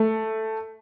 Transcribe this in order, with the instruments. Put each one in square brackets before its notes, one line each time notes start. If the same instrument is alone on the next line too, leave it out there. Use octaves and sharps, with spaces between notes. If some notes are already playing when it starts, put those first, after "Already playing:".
Already playing: [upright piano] A3